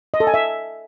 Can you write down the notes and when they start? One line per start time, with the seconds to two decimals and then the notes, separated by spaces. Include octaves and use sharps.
0.14 D#5
0.20 A4
0.27 G#5
0.34 E5